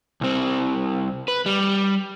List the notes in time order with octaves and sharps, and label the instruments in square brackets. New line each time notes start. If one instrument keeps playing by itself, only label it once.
[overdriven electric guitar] C2 C4
B4
G3